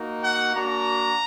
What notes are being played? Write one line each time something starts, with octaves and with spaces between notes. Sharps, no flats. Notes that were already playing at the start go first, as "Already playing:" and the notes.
Already playing: A#3 D#4 F#4
F#5
A#3 D4 F#4 A#5